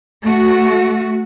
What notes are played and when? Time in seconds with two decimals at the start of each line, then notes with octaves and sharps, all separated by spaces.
0.24 A3 F#4